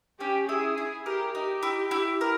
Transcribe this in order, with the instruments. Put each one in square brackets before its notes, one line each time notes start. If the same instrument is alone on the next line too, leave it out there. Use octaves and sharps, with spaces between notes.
[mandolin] C#4 [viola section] G4
[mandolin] E4 [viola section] G#4
[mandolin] E4
[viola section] G4 [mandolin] A#4
[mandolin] D#4 [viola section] G4
[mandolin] E4
E4
A#4